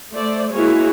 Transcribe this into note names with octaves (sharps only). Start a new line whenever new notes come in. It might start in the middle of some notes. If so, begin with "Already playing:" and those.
A3 C5 D5
G#3 A#3 E4 F#4 G#4 C#5